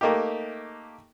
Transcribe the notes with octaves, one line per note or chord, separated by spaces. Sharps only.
A3 A#3 D#4 G4